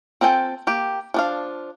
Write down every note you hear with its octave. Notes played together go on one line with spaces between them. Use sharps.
C4 F4 A4 G5 G#5
A#3 G4
F3 D4 F5